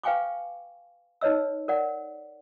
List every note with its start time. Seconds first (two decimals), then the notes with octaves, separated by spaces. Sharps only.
0.03 B4 F5 G5 G#5 C#6 D6
1.21 D#4 B4 C#5 D#5 E6
1.68 A#4 D5 F#5